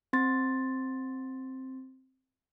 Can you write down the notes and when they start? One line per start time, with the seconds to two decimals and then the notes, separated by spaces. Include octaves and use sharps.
0.13 C4 C6 A6